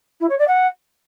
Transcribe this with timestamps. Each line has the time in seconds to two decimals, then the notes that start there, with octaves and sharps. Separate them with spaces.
0.20 E4
0.29 C#5
0.39 D5
0.48 F#5